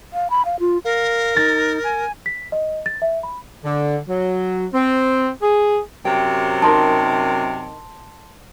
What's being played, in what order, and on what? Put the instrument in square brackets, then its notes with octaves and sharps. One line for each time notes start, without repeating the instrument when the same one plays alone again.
[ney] F5
B5
F5
F4
[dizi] A#4 [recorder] F5
[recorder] D#4 [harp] A6
[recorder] G#5
[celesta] B6
D#5
A6
E5
B5
[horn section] D3
F#3
C4
G#4
[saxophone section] F#2 C3 [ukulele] G5
[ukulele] D#4 A#4 [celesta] A5 C6